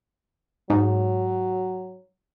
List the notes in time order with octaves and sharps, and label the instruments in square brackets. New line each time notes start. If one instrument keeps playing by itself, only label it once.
[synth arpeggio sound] G#2 [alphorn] F#3